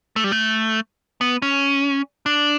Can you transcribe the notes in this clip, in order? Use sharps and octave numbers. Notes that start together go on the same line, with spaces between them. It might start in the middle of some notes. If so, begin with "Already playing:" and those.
A3
G3
A3
B3
C#4
D4